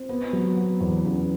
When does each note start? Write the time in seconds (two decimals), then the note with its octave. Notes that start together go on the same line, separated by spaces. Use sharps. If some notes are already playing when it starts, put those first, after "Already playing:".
Already playing: C4
0.09 B3
0.33 F#3
0.57 B3
0.81 E2
1.05 C#3